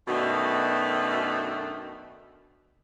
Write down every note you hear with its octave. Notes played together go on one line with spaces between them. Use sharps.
F#2 B2 D#3 A3 D4 F#4